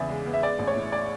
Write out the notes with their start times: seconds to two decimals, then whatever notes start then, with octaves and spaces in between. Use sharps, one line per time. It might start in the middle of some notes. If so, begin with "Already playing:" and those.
Already playing: E2 C#3 B3 D5 E5
0.09 G#3
0.26 B3
0.34 E5
0.43 G#3 D5
0.59 A1
0.67 C#5
0.76 A2
0.92 D5